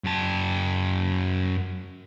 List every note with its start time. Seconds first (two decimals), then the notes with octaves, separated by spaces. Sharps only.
0.04 F#2 A5